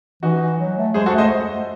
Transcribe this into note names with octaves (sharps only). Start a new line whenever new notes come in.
E3 D#4 F#4
F#3
A3
G#3 G#4 C5
F#4 A4
A3
C5 D#5